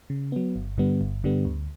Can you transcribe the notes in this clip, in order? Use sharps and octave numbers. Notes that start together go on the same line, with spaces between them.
C#3
F#3 B3
G1
G2 D3 G3 B3
G1
G2 D3 G3 B3
D2